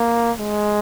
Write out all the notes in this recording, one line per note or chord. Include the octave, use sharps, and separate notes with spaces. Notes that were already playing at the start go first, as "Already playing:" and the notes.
Already playing: A#3
G#3